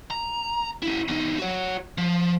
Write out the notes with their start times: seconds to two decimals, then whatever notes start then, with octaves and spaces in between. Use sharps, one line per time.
0.11 A#5
0.83 C#4 E4
1.08 E2 D#4
1.38 F#4 C#5
1.98 F3